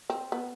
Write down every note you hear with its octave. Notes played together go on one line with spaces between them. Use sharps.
C4
B3